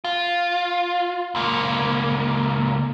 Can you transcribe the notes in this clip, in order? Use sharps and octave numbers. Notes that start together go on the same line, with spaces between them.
F4
C#2 A#3